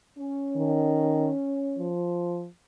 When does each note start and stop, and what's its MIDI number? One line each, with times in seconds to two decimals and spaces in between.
0.18 1.91 61
0.56 1.30 51
1.79 2.47 53